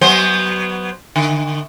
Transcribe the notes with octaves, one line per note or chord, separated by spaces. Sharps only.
F#3 B3 C5
D3